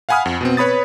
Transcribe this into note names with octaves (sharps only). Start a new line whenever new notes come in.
F5 F#5 G#5 B5 D#6 F6
F2
B2 B3 C4
B4 C#5 B5 D#6 A6